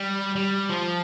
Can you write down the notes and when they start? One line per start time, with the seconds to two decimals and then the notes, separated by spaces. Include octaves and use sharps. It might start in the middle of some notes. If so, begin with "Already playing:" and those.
Already playing: G3
0.36 G3
0.69 F3